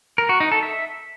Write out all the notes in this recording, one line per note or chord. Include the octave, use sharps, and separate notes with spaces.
A#4
F#4
D#4
A4
E5